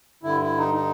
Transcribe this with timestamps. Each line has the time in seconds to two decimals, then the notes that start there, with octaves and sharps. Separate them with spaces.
0.23 G2 D3 E4
0.41 E4
0.58 D#4
0.74 D#4